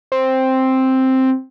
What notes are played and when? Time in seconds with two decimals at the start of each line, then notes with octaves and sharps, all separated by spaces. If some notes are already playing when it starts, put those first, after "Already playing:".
0.12 C4